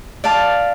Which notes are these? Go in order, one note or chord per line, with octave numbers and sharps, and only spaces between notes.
D5 F5 A5